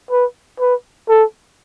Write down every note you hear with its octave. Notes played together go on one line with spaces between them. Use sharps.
B4
B4
A4